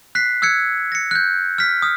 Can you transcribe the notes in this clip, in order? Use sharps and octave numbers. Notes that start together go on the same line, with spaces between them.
F#6 B6 C7
E6 F#6 G#6 C#7
A#6 C#7
F#6 G6
F6 B6
D#6 F6